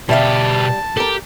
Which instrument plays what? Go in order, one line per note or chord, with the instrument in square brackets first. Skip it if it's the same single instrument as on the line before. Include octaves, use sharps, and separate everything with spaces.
[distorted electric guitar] B2 G4 [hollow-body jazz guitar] G3 E5 F5 [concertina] A5
[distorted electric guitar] G4 [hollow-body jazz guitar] A4 A#4